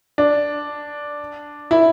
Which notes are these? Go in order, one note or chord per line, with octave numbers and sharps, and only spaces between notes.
D4
E4